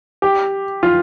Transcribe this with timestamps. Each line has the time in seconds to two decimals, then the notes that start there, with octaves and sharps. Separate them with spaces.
0.22 G4
0.83 F4